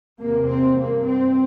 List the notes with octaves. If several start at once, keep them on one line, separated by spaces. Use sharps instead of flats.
E2 C3 A#3
C4
G2 A#3
C4